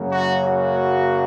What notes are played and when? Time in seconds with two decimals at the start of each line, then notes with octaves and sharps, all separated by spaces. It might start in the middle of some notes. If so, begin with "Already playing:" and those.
Already playing: F#2 C#3 F#3 A#3
0.10 F#4
0.42 F#4